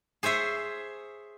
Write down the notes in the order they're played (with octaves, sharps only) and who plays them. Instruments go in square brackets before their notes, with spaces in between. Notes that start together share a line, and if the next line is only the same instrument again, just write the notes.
[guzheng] G#4 C5 C#5 E5 G#5